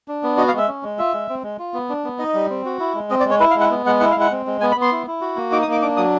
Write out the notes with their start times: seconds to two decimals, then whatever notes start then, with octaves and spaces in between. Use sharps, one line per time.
0.08 D4
0.23 B3
0.37 F#4 D#5
0.48 F5
0.53 G#3 E5
0.68 C#4
0.83 G#3
0.98 F4 E5
1.13 G#3
1.29 C4
1.43 G#3
1.59 F4
1.74 B3
1.89 D4
2.05 B3
2.19 D#4 D#5
2.34 G3
2.50 C4
2.65 F#4
2.80 E4
2.95 G#3
3.10 C4 D#5
3.20 D5
3.25 G#3
3.31 C#5
3.40 E4 B4
3.51 F5
3.55 G#3
3.60 F#5
3.70 B3
3.86 G#3 F#5
4.00 E4 F#5
4.11 F5
4.16 G#3 F#5
4.31 C4
4.47 G#3
4.61 B3 G#5
4.72 B5
4.76 B3
4.82 C6
4.92 E4
5.07 E4
5.21 F#4
5.37 A#3
5.52 D#4 D6
5.62 D#6
5.67 A#3 D6
5.82 D4 D6
5.97 F#3 D#6